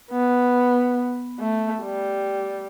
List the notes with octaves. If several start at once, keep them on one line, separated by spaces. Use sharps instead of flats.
B3
A3
G3